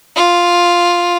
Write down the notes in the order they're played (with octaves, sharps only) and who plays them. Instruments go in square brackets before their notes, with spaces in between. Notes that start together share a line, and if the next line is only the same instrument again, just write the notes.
[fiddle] F4